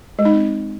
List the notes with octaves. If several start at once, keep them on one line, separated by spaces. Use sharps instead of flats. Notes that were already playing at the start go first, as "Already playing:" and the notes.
G#3
D#4
C4